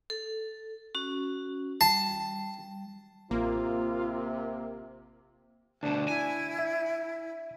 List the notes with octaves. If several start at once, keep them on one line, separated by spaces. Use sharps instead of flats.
A4
C#4 F#4
G3 A5
A1 C3 A#3 F4
D2 B2 D4
E4 G#5
E5